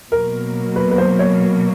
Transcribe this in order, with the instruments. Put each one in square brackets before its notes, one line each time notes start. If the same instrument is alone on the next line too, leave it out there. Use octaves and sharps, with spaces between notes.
[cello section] B2 F#3 A#3 [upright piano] A#4
[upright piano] B4
B4
C5
C#5